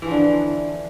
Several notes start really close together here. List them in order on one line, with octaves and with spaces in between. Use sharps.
E3 F3 D3